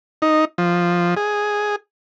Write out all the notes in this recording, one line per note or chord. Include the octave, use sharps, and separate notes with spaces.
D#4
F3
G#4